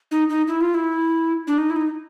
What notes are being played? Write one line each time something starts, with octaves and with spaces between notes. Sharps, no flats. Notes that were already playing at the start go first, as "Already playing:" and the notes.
D#4
D#4
E4
F4
E4
D4
D#4
E4
D#4